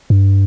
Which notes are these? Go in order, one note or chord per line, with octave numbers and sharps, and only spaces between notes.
G2